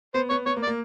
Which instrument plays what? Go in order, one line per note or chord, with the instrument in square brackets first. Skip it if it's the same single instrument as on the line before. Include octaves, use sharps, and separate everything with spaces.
[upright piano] B3 [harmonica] C5
[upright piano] B3 [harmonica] C#5
[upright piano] B3 [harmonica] C#5
[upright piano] A#3
[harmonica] D5
[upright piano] A#3